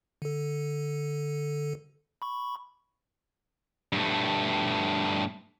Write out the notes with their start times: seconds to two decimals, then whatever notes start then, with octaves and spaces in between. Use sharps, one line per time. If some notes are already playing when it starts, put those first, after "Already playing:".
0.22 D3 A4
2.22 B5 C#6
3.93 G2 A3